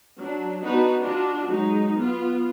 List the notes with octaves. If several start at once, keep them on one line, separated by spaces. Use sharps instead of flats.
F#3 D4
B3 D4 D#4 F#4 B4
D4 F4 F#4
F#3 G#3 D#4
B3 F4